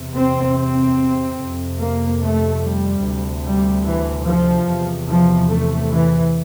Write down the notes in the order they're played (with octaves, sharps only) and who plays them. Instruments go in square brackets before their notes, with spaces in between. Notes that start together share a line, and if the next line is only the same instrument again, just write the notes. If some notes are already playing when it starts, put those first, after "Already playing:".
Already playing: [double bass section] E2 C3
C4
C4
F2 C3
A#3
A3
G3
D2 C3
G3
E3
F3
E2 C3
F3
A3
E3